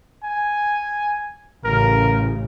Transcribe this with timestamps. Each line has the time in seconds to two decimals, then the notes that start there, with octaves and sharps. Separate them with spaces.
0.24 G#5
1.64 A1 C#3 A#4